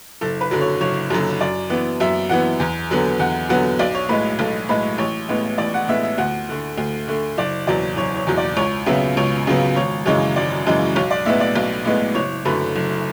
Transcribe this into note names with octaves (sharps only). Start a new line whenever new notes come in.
F#1 A4
B4
F#2 D3 F#3
C#5
F#1 C#5
F#2 D3 F#3
F#2 D5
E3 B3
F#2 E5
E3 B3 F#5
E2
D3 F#3 B3
E2 F#5
D3 F#3 B3 F#5
B1 D5
C#5
A2 G#3 B4
B1 A4
A2 G#3 B4
A1 C#5
A2 G#3 B3
A1 D5
F#5
A2 G#3 B3 E5
E5
D2 F#5
D3 A3
D2
D3 A3
F#1 D5
E2 B2 F#3 D5
F#1 C#5
C#5
E2 B2 F#3
D5
C#2 C#5
C#3 F#3 B3 E5
C#2 C#5
C#3 F#3 B3
G#1 C#5
F#2 C#3 E3 G#3 C#5
G#1 D5
F#2 C#3 E3 G#3
B1 C#5
D5
A2 G#3 B3 E5
D5
B1
A2 G#3 B3
F#1 C#5
F#2 D3 A3 B4
F#1